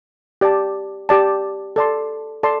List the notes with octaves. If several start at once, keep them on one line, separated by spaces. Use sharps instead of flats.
G4 D5 A5
G4 D5 A5
A4 D5 A5 C6
A4 D5 A5 C6